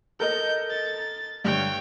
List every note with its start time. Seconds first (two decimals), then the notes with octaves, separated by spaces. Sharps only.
0.20 A4 A#4 D#5 G6
0.70 A6
1.45 G2 D3 C#5 G5